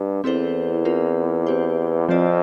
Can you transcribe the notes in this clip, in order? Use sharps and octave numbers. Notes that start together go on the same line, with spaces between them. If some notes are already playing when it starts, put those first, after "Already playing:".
Already playing: G2
E2 C4 E4 A4 C5
C4 F4 A#4
C4 G4 C5
F2 F3 C4 F4 A4 D5